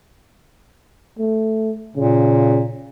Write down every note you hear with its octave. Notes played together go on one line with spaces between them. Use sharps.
A3
A#2 C#3